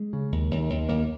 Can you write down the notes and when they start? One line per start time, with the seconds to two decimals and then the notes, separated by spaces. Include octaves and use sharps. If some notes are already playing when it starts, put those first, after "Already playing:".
Already playing: G#3
0.13 C#3
0.32 D#2
0.51 D#2
0.70 D#2
0.89 D#2 A#3